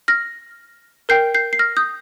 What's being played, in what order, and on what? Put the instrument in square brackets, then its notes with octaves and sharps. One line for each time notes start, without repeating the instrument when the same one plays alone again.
[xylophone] F6 A#6
A#4 G5 G6 C7
G6 C7
C7
F6 A#6
D#6 G6